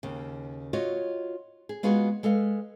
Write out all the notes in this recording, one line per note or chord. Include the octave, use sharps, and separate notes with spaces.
D#2 C#3
F4 F#4 C#5 D#5
G#4
G#3 B3 F4 F#4 G#4
G#3 A4 B4 F5